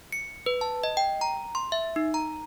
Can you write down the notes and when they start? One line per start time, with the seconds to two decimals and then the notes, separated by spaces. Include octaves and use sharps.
0.12 C#7
0.46 B4
0.61 A5
0.83 D#5
0.97 G5
1.21 A#5
1.55 C6
1.72 E5
1.96 D#4
2.14 A#5